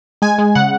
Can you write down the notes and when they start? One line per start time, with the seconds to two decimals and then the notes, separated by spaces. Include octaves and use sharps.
0.22 G#3 G#5
0.38 G#3
0.55 C#3 F#5